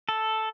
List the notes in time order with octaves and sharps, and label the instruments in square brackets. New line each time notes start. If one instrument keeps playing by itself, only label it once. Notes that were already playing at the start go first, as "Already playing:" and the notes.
[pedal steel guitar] A4